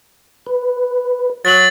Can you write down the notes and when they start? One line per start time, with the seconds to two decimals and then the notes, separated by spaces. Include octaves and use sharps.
0.46 B4
1.45 F#3 A6 F#7